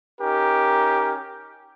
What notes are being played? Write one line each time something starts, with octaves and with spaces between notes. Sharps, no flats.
C#4 D#4 G4 A#4